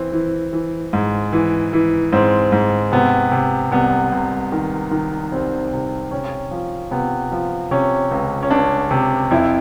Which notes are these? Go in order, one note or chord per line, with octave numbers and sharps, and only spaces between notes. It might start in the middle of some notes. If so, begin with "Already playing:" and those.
Already playing: E3 C4
E3
E3
G#2
E3
E3
G#2 C4
G#2
C3 B3
C3
C2 B3
C2
D#3
D#3
C2 C4
C3
C3 C#4
F3
C3 B3
F3
C3 C#4
C#2
C#4
C#2 D4
C3
F2 E4